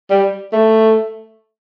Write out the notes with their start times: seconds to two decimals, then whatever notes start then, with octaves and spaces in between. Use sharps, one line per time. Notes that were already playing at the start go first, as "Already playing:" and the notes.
0.10 G3
0.53 A3